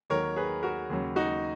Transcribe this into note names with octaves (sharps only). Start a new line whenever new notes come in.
D#2 D#3 F#3 A#4 C#5
G#4 B4
F#4 A#4
D#2 C#3 F#3
D#4 F#4